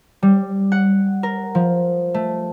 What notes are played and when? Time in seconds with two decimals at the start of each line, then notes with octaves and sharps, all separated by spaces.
0.23 G3
0.72 F#5
1.23 A#4
1.55 F3
2.14 A3